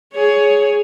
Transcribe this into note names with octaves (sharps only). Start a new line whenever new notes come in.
G#4 C#5